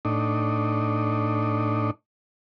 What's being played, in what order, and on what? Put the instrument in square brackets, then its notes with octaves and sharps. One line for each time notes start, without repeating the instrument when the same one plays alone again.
[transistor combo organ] A2 D4 D#4